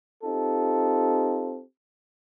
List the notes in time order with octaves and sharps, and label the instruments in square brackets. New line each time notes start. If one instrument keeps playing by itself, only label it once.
[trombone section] C4 D#4 F4 G4 A4